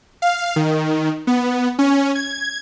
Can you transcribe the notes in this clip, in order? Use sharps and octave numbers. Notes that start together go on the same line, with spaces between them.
F5
D#3
B3
C#4
G#6